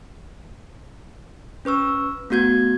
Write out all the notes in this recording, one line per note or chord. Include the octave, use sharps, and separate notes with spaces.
C#4 B4 C#6 E6
A3 B3 F#4 G6 G#6